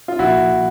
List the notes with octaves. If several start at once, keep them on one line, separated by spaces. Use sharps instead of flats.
F4
C2 A#2 F3 A#3 E4 F#4